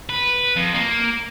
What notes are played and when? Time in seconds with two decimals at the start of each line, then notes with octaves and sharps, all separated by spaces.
0.09 B4
0.57 F2
0.74 A#3